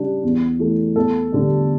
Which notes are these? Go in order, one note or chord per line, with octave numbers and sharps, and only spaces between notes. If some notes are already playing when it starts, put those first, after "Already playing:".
Already playing: C#3 G3 D4
E2
E3 A3
E2 A4
D3 G3 D4